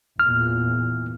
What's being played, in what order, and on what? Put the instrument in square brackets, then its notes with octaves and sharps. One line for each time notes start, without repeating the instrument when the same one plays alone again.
[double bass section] E2 A#2 [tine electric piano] F6